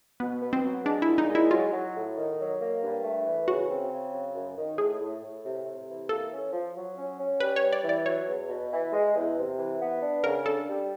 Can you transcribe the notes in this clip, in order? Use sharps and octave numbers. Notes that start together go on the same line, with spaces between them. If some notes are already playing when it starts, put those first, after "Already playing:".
B2 B3
B3
C4
F#3
G#3 D4
E4
A#2
D#4
G#3
E4
F#3 F4
F#3
A2
D#3
F#3
A#3
G2
A3
E3
C#3 F#4
C4
C#3
F#3
F#2
D#3
A2 G#4
A2
A2
C3
C3
E3
A#3 A4
C#4
F3
F#3
C#4
C#4
G3 B4
C#5
G3
D5
E3
D5
F#3 C#5
E2
B2
E3
G#3
E2
C3
E3
B3
D4
C#3 A#4
D4 A4
G3